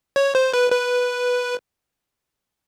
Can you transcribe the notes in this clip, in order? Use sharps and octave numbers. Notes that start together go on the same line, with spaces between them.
C#5
C5
B4
B4